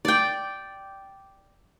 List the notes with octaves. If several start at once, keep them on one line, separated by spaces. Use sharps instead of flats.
D5 G5